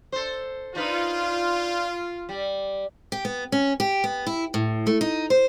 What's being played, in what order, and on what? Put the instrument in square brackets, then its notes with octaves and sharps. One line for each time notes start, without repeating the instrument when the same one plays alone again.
[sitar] A4 C5
[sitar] D4 D#4 B4 [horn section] F4
[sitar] G3
[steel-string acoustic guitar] G4
B3
C#4
G4
B3
E4
A2
A3
D#4
C5